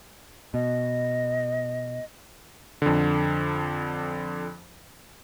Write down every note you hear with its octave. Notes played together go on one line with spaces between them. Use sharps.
B2 D#5
F2 D3